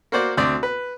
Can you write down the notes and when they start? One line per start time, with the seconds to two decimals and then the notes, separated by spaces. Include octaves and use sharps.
0.12 A#3 F#4 C5 D5
0.37 D2 C4 D5
0.63 B4